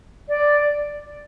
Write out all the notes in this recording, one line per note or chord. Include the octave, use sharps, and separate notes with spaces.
D5